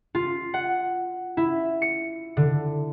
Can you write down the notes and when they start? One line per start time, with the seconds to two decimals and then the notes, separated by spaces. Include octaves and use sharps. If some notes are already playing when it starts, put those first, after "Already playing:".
0.15 F4
0.54 F#5
1.37 E4
1.82 C#7
2.37 D3